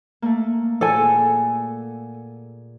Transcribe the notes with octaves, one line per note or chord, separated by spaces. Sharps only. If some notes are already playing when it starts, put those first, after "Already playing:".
A3 A#3
A#2 G#4 A4 F#5 G#5